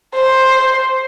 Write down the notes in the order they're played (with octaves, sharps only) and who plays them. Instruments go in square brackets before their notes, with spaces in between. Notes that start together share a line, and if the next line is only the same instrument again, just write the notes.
[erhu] C5